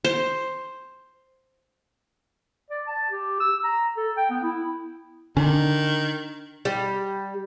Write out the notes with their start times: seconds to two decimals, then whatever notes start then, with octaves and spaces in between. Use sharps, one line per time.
0.05 C5
2.70 D5
2.87 A5
3.11 G4
3.40 E6
3.64 A#5
3.97 A4
4.17 G5
4.30 B3
4.43 E4
5.37 D3 D#3 C#4 D4
6.65 G3